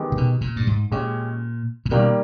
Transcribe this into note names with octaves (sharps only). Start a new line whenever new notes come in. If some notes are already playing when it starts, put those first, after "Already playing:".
Already playing: D#3 G#3 B3 D#4 G4
C#3
B2
A#2
G2
G#2
A#2 G#3 C#4 G4
A#2
B2 D#3 G3 A#3